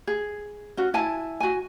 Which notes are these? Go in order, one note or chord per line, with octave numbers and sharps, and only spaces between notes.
G#4
C#4 F#4
E4 G#5 A5
F#4 G#5